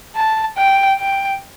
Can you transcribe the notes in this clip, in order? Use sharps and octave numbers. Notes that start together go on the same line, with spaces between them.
A5
G5
G5